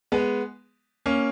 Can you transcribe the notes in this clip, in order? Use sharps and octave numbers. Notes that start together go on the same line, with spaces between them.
G#3 B3
A#3 C#4